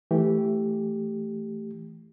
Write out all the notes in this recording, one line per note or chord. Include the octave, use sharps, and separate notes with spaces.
E3 A3 G4